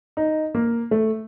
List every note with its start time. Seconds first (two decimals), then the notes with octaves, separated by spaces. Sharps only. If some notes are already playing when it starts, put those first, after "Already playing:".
0.17 D#4
0.55 A#3
0.91 A3